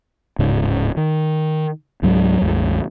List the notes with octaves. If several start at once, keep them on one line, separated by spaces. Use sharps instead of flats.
D1 G#2 C#3
D#3
C#2 G#2 F#3 G#3
A1 E2 G#3